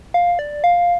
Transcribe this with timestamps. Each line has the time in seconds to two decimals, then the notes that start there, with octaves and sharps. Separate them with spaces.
0.14 F5
0.39 D5
0.64 F5